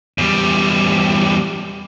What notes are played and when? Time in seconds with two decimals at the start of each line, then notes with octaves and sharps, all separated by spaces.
0.18 E2 G3